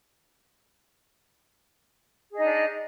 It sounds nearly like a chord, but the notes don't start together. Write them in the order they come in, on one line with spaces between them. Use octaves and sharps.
G#4 D#5 D#4 D4